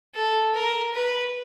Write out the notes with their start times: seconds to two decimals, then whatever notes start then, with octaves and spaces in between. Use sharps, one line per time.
0.14 A4
0.54 A#4
0.94 B4